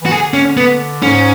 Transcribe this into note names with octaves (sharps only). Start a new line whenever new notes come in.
E3 F#4
D3 G#4
C#4
B3
G#2 C#4